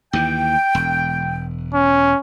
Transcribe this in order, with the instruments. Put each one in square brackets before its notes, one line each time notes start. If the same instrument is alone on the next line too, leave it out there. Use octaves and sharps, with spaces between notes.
[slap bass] D#2 E3 [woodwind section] G5
[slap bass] E1
[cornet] C#4